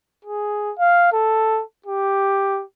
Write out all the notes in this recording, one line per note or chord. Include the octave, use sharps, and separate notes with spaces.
G#4
F5
A4
G4